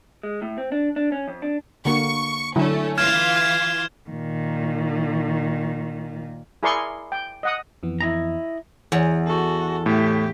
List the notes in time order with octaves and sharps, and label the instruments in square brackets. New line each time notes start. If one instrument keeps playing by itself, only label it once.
[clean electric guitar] G#3
A2
C4
D4
D4
C#4
F2
D4
[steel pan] D3 A#3 F#4 [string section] C#6
[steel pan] D3 F#3 E4 [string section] A3 C#4
[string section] E3 F4 F5 [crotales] F6 G#6 E7
[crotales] F6 G#6
[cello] A#2 D#3
[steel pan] E4 G#4 A#4 D5 C6 C#6
G5
D#5 F#5 D#6
[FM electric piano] F2 E3 B3
[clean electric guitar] E4 D#5 A#5
[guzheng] E2
[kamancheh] F#4 A4
[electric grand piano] A2 A3 [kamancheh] G4